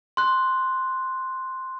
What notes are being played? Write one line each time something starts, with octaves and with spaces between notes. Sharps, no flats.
C6 F#6